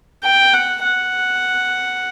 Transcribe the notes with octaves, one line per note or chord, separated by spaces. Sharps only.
G5
F#5
F#5